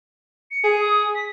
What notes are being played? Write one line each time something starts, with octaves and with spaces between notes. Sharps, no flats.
C#7
G#4
D#6
B6